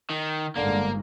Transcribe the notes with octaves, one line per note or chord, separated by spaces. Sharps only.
D#3
G1 G#2 D3 A#3